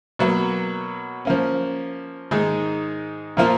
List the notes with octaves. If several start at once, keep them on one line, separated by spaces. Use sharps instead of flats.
B2 F#3 A#3
F3 A#3 C#4
G#2 D#3 G#3 D#4 G#4
A#2 F3 A#3 F4